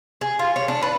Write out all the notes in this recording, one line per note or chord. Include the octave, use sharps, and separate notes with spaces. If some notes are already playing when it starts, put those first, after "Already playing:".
G#4
F4
C#5
D4
B4